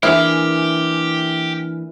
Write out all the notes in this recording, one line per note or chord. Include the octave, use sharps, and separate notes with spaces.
E3 A#3 D4 E4 G4 G#4 F6